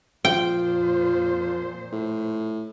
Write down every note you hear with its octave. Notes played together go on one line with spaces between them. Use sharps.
F2 A#2 F3 C5 G5
A2